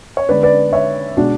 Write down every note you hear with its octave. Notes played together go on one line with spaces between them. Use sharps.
C#5
D3 G#3 B3 B4 D5
B4 D5
C#5 E5
B2 G#3 B3 D4 F#4